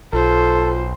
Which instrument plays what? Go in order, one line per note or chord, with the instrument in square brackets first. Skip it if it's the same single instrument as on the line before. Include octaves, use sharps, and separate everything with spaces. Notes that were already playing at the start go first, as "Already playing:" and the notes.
[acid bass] B1 [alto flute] F4 [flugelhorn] A4 [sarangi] C5